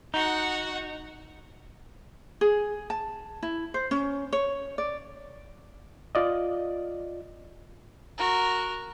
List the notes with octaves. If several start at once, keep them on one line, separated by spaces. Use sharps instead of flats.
D#4 F#4 F#5
G#4
A5
E4
C5
C#4
C#5
D5
F4 D5 D#5
F#4 A#4